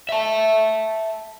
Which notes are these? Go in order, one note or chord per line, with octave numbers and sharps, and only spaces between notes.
E5 A5